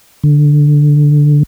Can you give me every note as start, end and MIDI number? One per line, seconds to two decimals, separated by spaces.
0.24 1.43 50